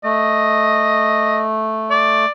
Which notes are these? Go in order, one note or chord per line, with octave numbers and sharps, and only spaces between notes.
A3 D#5
D5